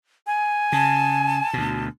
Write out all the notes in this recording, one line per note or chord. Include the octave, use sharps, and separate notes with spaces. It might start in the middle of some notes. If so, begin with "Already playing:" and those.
G#5
C#3 A5
D2 B2